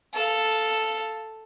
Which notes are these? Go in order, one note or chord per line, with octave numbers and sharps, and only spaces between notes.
A4 F5